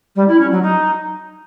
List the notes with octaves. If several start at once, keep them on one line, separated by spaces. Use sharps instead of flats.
G3
E4
C#4
F#3
D#4